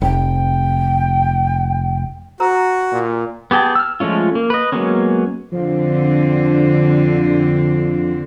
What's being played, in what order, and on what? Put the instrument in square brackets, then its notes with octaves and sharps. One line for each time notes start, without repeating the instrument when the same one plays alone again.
[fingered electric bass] F1 [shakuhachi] G5
[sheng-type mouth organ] F#4 [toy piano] C5 A#5 E6
[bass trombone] A#2
[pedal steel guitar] B3 G4 G#4 G5 A5
E6 F6
F3 G#3 A3 C#4 F4
A#3
B4 D#5
F#3 G#3 A#3 B3 C#4
[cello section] F2 D3 C4 [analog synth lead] F3